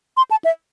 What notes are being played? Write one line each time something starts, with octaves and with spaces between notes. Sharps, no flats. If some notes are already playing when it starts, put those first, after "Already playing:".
C6
A5
E5